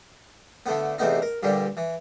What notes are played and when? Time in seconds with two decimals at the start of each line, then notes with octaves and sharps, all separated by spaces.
0.66 D3 A3 B3
0.98 E2 C3 A3 B3 D#4
1.22 A#4
1.43 G2 A#2 D3 G3
1.77 E3